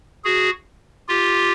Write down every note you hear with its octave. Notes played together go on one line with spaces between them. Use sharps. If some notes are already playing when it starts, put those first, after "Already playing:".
F#4 G#4
F4 G4